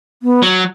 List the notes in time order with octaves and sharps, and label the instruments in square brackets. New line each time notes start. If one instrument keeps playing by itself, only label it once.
[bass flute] B3
[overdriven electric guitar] F#3